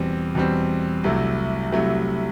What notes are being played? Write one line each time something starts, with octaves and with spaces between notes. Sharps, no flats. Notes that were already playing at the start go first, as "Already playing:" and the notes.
Already playing: E2 B2 G3 C4
E2 B2 G3 C4
C2 C3 F#3 A3 E4
C2 C3 F#3 A3 E4